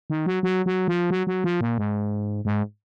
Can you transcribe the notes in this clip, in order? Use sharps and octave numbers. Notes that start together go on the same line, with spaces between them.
D#3
F#3
F#3
F#3
F3
F#3
F#3
F3
A#2
G#2
G#2